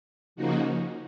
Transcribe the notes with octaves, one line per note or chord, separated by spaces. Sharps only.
C#3 F3 A#3 D#4 F#4